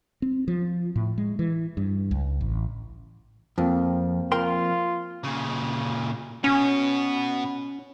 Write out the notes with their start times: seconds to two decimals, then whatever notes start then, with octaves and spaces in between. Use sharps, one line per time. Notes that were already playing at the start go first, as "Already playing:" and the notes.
0.22 C4
0.48 F3
0.96 A2
1.18 G#3
1.39 E3
1.77 G2
2.11 C#2
2.41 A1
3.58 F2 F3 A#3 C4
4.32 F4 A#4 G5 C6
5.24 A#2 C#3
6.44 B2 B3 C#4